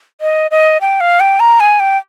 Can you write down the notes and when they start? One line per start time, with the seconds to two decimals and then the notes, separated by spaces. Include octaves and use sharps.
0.21 D#5
0.51 D#5
0.81 G5
1.00 F5
1.20 G5
1.40 A#5
1.60 G#5
1.80 G5